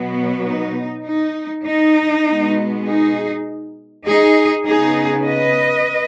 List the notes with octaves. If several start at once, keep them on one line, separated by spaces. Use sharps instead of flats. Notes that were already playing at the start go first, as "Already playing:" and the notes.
Already playing: B2 F#3 B3
D#4
D#4
D#4
B2 G#3 B3
D#4 G#4
D#4 G#4
C#3 B3 D#4 G#4
B4 D#5